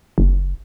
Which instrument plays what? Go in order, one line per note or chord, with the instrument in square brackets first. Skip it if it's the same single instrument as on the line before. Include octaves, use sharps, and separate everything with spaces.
[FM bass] F#1